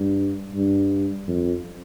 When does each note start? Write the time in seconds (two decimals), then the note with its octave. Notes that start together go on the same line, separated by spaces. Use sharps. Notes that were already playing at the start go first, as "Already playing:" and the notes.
Already playing: G2
0.55 G2
1.28 F2